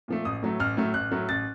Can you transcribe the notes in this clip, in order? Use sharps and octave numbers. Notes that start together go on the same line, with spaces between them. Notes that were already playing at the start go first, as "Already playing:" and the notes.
A#2 F3 A3
A1 D#6
A2 F#3 A3
A1 F6
A2 F#3 A3
A1 F#6
A2 F#3 A3
A1 A6